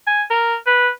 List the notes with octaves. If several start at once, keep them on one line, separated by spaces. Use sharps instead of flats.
G#5
A#4
B4